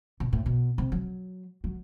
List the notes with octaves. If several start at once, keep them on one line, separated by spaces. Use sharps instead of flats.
B2
A2
B2
C3
F#3
F#3